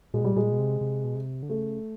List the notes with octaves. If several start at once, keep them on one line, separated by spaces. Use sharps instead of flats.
A#2 G#3
B2
A#2 G3
A#2 G#3
B2
C3
C3
B2
C3
D3
C#3 A3